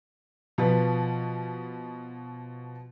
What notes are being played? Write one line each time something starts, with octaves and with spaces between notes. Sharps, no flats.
B2 F3 B4